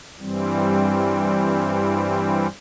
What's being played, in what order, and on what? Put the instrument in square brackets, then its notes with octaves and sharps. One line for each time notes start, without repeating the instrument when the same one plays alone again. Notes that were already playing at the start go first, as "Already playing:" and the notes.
[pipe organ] G2 E3 G3 C4